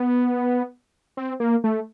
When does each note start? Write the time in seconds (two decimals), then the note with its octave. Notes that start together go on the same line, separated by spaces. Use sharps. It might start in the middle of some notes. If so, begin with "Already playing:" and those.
Already playing: B3
1.17 C4
1.40 A#3
1.64 A3